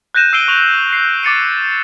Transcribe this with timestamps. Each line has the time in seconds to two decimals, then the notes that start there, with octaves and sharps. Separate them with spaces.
0.14 F#6 G6 A#6 D#7 E7
0.33 E6 C7 D7 D#7 G7
0.48 C#6 F7 F#7
0.93 G6 C7
1.23 D6 A6 C#7 D#7